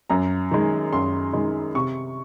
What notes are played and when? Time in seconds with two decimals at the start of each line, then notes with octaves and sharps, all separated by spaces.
0.10 F#2 A#5
0.51 D#3 G#3
0.93 F#2 C6
1.33 D#3 G#3
1.75 C3 C#6